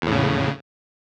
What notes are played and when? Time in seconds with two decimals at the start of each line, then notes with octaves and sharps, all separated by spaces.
0.02 E2
0.07 A2
0.12 C#3